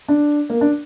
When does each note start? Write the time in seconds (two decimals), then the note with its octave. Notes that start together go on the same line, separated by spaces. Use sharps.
0.08 D4
0.50 A#3
0.61 D4